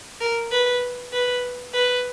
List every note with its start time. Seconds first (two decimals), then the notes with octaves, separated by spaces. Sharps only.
0.21 A#4
0.52 B4
1.13 B4
1.74 B4